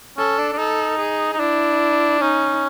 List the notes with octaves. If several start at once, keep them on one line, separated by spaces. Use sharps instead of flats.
C#4 A4
D4
D4
D#4 A4
G#4
D#4
D4 E4
C#4 D#4